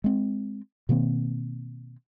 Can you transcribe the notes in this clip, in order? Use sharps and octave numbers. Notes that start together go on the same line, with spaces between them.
G#3 C4
B2 D#3 A#3 C4